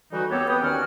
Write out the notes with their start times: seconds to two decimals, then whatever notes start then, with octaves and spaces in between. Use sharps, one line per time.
0.12 D3 E3 G3 D#4 F#4
0.29 D#2 B3 C4 G4 A4 C#5
0.47 B4 G5 D#6
0.62 D#2 D#3 C#4 F#4 D5 F6